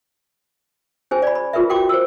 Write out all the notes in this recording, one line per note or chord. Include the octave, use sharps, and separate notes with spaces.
C#4 G#4 C5 G#5
D5 B5
B5
F4 G#4 A#4 B4 E5
F#4 A#4 G5 C6 D6
C5 E6